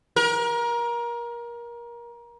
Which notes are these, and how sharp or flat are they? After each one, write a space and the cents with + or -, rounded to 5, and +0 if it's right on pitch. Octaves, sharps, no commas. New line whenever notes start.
A#4 +25